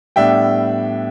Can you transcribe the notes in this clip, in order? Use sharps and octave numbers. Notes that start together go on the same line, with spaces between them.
A2 G3 B3 D4 E5 G5